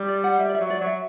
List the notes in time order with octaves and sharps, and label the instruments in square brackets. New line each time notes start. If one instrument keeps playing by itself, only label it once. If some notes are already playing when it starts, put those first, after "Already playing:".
Already playing: [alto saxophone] G3
[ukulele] D5
F#5
[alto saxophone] G3 [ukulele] E5
[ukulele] D5
E5
[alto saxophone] F#3
[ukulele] D5
[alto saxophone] F#3 [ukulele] E5